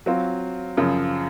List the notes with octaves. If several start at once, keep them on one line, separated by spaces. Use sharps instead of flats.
F#3 C4 F4
F#2 C#3 F3